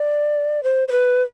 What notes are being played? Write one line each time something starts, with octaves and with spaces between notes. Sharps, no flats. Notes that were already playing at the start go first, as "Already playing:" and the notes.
Already playing: D5
C5
C5
B4